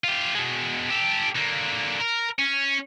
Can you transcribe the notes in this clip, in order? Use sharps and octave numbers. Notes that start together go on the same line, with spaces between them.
F4 G4
B2 G#3
G4 A4
D3 A#3
A#4
C#4